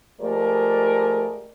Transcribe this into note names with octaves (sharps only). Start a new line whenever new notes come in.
F3 G#3 A3 G4 A#4 D5